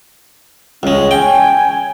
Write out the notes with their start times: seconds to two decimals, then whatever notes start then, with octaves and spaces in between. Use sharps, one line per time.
0.83 C#2 G#3 C#4
1.11 G5 G#5